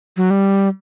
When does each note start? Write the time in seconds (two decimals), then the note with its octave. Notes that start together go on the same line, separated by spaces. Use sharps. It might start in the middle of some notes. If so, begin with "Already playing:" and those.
0.17 F#3
0.30 G3